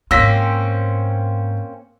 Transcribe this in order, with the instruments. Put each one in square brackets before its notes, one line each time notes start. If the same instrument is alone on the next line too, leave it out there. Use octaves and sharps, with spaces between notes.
[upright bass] G#2 F4 [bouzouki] A#3 C4 C#4 [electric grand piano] E6 A#6 B6